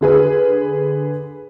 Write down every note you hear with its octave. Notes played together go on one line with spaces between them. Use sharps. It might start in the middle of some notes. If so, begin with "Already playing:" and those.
D3 G#4 B4